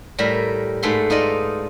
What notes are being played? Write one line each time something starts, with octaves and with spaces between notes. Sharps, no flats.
A2 G3 A#4 E5
G#2 A3 A4 B4 C6
D#4 F4 D5 D#5